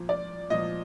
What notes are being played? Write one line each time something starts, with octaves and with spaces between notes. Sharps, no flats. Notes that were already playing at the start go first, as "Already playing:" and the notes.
Already playing: A#2 F3
D5
A#2 F3 D#5